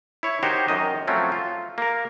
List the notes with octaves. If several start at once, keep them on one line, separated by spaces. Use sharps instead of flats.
E4 C#5
D#3 D#4 F#4 G4 C5 C#5
F#2 D#3 D#5
F3 F#3 A3 C4 C#4
F4
A#3 A#4